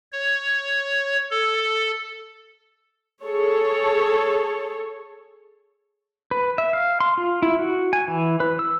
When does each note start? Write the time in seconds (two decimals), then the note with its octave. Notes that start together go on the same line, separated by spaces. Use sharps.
0.12 C#5
1.31 A4
3.24 G#4 A4 C#5
6.31 B4
6.58 E5
6.73 F5
7.00 C6
7.18 F4
7.42 E4
7.59 F#4
7.93 G#5
8.08 E3
8.40 B4
8.59 E6